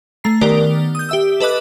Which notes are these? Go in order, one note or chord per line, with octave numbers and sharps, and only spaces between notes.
A3 A#5 C7
D#3 B3 G4 A#4 D5
D#6 G6
G4 E5 E6
A4 B4 D#5 D6 F#6